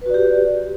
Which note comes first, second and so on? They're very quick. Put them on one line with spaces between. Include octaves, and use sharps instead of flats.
B4 F#4 D5 G4